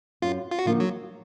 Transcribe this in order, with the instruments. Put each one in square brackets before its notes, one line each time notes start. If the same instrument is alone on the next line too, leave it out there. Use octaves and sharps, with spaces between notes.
[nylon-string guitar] F#2 [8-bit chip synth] F4
[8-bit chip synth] F4
F#4
[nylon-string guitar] D3 F3 A#3 D#4 [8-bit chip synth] F4
[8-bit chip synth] F#3